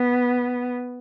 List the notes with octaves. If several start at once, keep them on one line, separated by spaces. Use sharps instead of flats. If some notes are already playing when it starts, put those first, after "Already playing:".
Already playing: B3